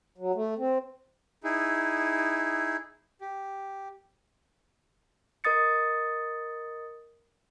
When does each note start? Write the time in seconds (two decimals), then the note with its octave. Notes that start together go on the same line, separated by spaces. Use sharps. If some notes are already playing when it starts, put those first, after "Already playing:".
0.18 F#3
0.35 A3
0.58 C4
1.44 D#4 E4 G#4
3.21 G4
5.44 A#4 D#5 D#6 A6 C#7